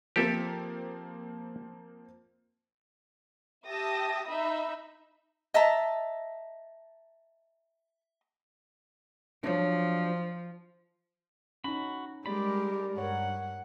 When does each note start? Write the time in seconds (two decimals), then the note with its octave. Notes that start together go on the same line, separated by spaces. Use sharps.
0.16 F3 A#3 C4 G4 A4 E5
3.67 G4 E5 A5 D#6 A#6
4.28 D#4 E5 B5
5.54 D#5 E5 A5 A#5
9.43 F3 F#3 D4
11.64 C#4 D#4 F#4 B5
12.26 G3 G#3 G4 A#4 D5 B5
12.98 G2 A#4 C#5 F#5